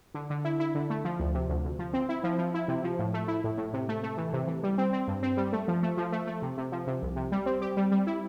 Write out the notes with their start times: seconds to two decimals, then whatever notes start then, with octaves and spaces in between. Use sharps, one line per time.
0.14 D3
0.30 D3
0.45 E4
0.60 E4
0.75 D3
0.90 A3
1.05 F3
1.20 D2
1.34 C3
1.49 D2
1.64 D2
1.79 F3
1.93 C4
2.09 E4
2.24 F3
2.38 F3
2.54 E4
2.68 C3
2.84 F3
2.99 A2
3.14 A3
3.28 E4
3.44 A2
3.58 A2
3.73 C3
3.89 A3
4.03 A3
4.17 E3
4.33 C3
4.47 E3
4.63 G3
4.78 C4
4.93 C4
5.08 G2
5.23 C4
5.37 G3
5.53 A3
5.68 F3
5.83 A3
5.97 F3
6.12 A3
6.27 A3
6.42 C3
6.58 C3
6.72 F3
6.87 C3
7.02 C2
7.16 C3
7.32 G3
7.46 C4
7.62 G4
7.77 G3
7.92 G3
8.07 E4